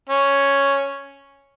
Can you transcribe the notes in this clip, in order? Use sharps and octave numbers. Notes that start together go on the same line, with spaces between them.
C#4